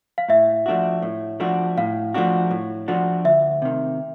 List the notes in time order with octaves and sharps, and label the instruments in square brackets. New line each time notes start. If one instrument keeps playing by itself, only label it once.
[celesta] F5
[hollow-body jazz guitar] A2 [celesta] E5
[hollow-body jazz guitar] F3 A3 D4 F#4
A2
F3 A3 D4 F#4
[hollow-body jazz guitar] A2 [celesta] F5
[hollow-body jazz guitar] F3 A3 D4 F#4
A2
F3 A3 D4 F#4
[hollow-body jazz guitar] D2 [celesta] E5
[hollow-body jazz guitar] C3 D#3